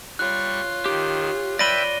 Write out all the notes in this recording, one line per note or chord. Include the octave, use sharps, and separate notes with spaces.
G3 F4 C#5 C#6 F#6
D#3 G4
B4 D5 E5 G5 B5 A#6 D#7 G7